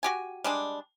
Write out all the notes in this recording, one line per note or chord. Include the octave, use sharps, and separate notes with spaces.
F#4 G4 G#5
G3 G#3 D4